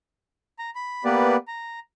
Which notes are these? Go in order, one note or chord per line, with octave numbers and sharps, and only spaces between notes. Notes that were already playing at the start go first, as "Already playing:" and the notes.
A#5
B5
A#3 B3 G4 B4 D5
A#5